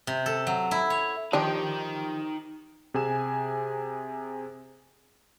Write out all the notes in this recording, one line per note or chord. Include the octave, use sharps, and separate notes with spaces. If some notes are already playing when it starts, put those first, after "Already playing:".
C3
A4
F#3
E4
C#5
D#3 F3 D4 D#4 G4 G5
C3 G#4 G#5 E7